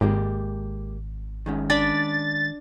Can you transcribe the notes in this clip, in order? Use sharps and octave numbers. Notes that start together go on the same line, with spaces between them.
G#1 G#3 A#3 G4
D#3 G#3 C#4
D4 D5 B5 A6